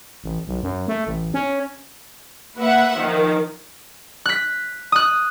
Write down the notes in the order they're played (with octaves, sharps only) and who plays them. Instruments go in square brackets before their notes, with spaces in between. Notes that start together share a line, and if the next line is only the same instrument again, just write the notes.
[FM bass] A1
B1
F#2
A3
A1
C#4
[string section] A#3 B4 E5 F#5
D#3 F3
[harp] F#6 B6
D#6 F#6